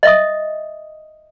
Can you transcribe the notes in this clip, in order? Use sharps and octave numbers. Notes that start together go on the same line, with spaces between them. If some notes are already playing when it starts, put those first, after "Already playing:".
D#5 E5 D#6